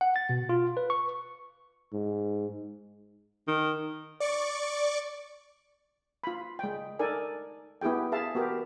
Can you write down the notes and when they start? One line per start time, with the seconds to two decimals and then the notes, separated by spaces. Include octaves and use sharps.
0.01 F#5
0.16 A6
0.29 B2
0.49 F4
0.77 B4
0.90 C#6
1.93 G#2
3.48 D#3
4.20 D5 C#6 D6
6.24 F4 B5
6.59 G#3 G5
6.99 D#4 A4 A#4 D5 G#5
7.81 B3 E4 G4 G#4 G5
8.12 G#4 E5 F5 A5
8.35 B3 F#4 G4 A#4